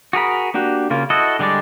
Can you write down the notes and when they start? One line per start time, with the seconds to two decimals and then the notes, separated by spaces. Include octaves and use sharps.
0.13 F#4 G#4 A#4 B5
0.54 A#3 D4 F#4 G4
0.90 C#3 A#3 F4
1.10 E4 F#4 A4 D#5
1.39 D3 G3 G#3 D4 D5